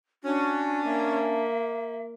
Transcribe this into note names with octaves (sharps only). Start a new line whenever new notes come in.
C#4 D4 F#4
A#3 E5